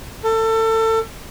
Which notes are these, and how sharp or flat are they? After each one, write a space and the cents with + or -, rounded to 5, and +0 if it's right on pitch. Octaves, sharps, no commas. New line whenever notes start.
A4 +25